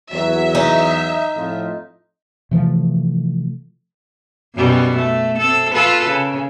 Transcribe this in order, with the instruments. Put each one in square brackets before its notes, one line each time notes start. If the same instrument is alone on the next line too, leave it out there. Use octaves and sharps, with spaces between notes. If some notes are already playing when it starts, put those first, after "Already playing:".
[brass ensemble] E2 F#3 [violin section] E5
[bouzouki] D#4
[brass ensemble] F2 A2 F4
[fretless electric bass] C3 E3 F3 A3
[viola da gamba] F#2 B2 G3
A3
C4 A4
F4 A4 B4
C#3